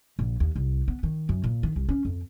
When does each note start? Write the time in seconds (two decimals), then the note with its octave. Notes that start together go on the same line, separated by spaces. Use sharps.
0.19 A#1
0.40 D#2
0.56 C2
0.88 B3
1.03 D#3
1.29 F#2
1.44 A#2
1.63 D#3
1.76 C2
1.89 C#4
2.05 F2